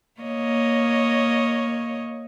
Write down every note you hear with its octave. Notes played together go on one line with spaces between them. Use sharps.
A#3 C#5 D#5